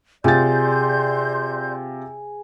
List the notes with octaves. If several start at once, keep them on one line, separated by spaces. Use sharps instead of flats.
C3 F4 G#4 D5 C6 G6 A6